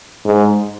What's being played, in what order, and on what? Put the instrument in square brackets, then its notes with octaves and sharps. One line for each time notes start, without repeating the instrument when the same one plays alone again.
[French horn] G#2